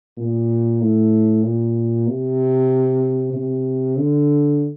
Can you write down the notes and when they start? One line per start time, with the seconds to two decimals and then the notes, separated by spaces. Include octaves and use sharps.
0.17 A#2
0.81 A2
1.45 A#2
2.08 C3
3.33 C3
3.98 D3